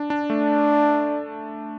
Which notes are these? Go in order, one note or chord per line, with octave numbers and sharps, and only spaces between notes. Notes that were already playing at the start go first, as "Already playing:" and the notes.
Already playing: D4
D4
D4
A3